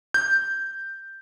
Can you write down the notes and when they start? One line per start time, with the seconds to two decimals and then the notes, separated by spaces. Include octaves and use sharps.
0.14 G6